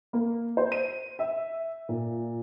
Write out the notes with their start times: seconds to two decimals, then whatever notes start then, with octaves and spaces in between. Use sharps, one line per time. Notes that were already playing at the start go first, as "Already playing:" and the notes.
0.13 A#3
0.57 C5
0.72 D#7
1.19 E5
1.89 A#2